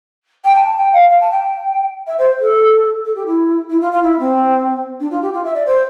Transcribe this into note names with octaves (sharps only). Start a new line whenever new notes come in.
G5
A5
A5
G5
F5
F5
A5
G5
E5
C5
A4
A4
G4
E4
E4
F4
F4
E4
C4
D4
F4
G4
F4
E5
D5
C5